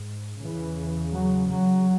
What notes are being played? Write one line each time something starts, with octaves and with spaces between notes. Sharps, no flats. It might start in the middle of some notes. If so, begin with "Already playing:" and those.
Already playing: G#2
E2 C#3 E3
F#3
F#3